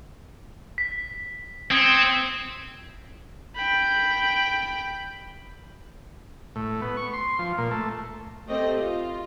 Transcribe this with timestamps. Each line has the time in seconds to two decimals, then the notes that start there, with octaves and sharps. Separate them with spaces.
0.78 B6
1.71 C4 D#6 G#6 C#7
3.56 G5 B5
6.56 A2
6.82 B3
6.97 C#6
7.13 C6
7.39 F3
7.58 A#2
7.71 A3
8.47 A3 C4 G4 D#5
8.78 F4